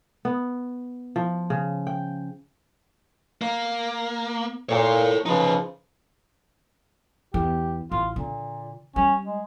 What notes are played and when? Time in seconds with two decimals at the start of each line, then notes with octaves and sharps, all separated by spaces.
0.25 B3
1.16 F3
1.50 C#3
1.87 G5
3.42 A#3
4.69 A#2 A4 C#5
5.26 C#3 F3 D#4 B4
7.34 E2 G4
7.91 A1 F4
8.16 A#2 D3
8.96 G3 C#4
9.25 G#3